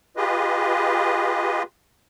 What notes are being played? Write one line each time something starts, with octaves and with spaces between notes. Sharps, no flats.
F4 G4 G#4 B4 D#5